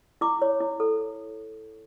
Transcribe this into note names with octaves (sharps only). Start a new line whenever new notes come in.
E4 D6
C#5
E4
A4